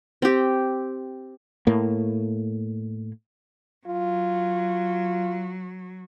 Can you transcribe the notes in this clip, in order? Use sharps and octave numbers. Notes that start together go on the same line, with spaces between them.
C4 G4
A2 A#3
F#3 F4